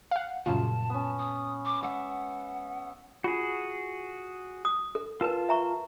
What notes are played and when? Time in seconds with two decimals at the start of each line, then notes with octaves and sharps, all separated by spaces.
0.11 F5 F#5
0.46 F#2 A#2 C#3 G3 F4 A5
0.90 B3 C#4
1.18 D#6
1.65 D6
1.83 G#3 E5 F#5
3.24 F4 F#4 G#4
4.65 D#6
4.95 A4
5.21 F4 A#4 B4 A5
5.49 E5 A#5 C#6